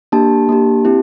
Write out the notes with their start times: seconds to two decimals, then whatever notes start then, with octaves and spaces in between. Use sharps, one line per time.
0.12 A#3 D4 G4 A5
0.49 A#3 D4 G4
0.85 C4 E4 G4